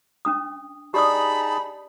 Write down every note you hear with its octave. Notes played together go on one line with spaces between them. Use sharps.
C#4 D4 D#6
D#4 G4 G#4 D5 A5 B5 D#6